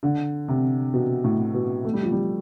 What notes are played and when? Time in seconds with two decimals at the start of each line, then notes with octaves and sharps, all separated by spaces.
0.03 D3
0.48 C3
0.94 B2
1.24 A2
1.54 B2
1.85 A3
1.93 G3
2.03 F3
2.12 G3